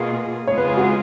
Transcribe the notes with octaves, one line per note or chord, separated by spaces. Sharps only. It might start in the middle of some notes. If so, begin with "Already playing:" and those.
Already playing: B2 A#3 F4 G#4
C#3 G#3 B3 F4 G#4 C#5
B4
B4
F#4